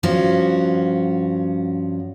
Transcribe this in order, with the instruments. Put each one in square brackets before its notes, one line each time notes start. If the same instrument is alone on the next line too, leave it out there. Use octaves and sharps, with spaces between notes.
[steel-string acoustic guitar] G2 F3 C#4 F#4